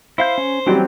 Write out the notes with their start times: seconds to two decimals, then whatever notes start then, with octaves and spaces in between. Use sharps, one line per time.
0.18 E4 C5 F5 G6
0.38 C#4
0.66 E3 F#3 G3 C4 C#4 G5